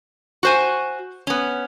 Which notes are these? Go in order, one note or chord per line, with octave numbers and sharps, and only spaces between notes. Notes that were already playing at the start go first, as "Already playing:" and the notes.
F#4 C5 G#5
B3 C#4